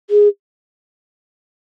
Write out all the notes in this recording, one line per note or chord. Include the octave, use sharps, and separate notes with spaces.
G#4